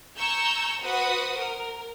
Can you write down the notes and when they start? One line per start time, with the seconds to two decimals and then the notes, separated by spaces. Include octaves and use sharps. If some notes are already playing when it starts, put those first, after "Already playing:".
0.17 G#5 A#5 C#6 E6 G6
0.83 F#4 B4 C5 F#5 D#6
1.37 A#4